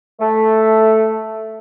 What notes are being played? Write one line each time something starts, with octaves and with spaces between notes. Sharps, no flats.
A3